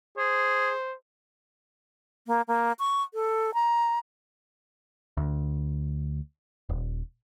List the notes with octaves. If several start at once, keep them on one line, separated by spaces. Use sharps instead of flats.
G#4 C5
A#3
A#3
C#6
A4
A#5
D2
D#1